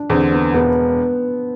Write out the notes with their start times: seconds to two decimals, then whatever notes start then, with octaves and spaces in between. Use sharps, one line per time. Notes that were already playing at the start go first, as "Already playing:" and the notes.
Already playing: D4
0.10 E2 C4
0.14 D3
0.32 B3
0.54 E1 B3